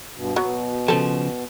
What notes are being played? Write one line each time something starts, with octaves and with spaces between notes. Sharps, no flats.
G2 B2
B2 F#3 B3
C#3 F3 A4 C5